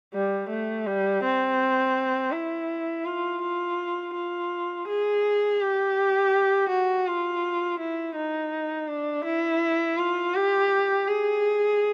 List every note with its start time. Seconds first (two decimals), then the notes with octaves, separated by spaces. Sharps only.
0.14 G3
0.50 A3
0.87 G3
1.24 C4
2.32 E4
3.06 F4
3.42 F4
4.15 F4
4.88 G#4
5.61 G4
6.70 F#4
7.06 F4
7.80 E4
8.15 D#4
8.89 D4
9.25 E4
9.98 F4
10.35 G4
11.08 G#4